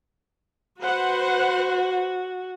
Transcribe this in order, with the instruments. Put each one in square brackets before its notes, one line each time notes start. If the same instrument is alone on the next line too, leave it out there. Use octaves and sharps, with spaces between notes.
[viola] F#4 [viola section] B4 C5 F#5